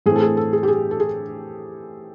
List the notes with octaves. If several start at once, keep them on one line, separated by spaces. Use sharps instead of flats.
A2 E3 A3 C4 G#4
A4
G#4
A4
G#4
G4
G#4
A4
G#4